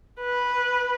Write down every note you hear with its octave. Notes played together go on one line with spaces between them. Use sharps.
B4